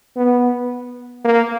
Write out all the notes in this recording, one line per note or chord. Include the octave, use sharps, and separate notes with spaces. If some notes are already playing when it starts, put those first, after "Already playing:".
B3
A#3